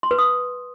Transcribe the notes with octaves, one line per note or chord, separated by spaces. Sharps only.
C6
B4
D#6